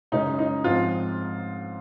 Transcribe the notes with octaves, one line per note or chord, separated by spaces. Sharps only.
F#2 C#3 G#3 C#4 D#4
D#4
G#2 F3 G#3 C4 F4